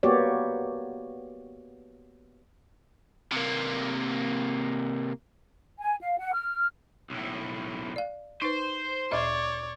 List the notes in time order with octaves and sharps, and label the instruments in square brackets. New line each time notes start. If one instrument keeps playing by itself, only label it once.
[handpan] A#3 B3 F#4 G4 C#5 D5
[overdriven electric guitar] C3 A#3
[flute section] G#5
F5
F#5
F6
[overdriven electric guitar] B1 A2
[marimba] D5 F5
[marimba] D#4 B4 [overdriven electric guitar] C5
[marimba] D2 A#2 E5 [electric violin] C#5 D5